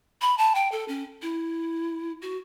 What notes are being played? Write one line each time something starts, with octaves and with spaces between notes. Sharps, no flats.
B5
A5
G5
A4
C#4
E4
F#4